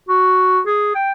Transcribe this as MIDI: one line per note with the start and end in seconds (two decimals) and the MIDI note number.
0.09 0.60 66
0.67 0.93 68
0.95 1.12 79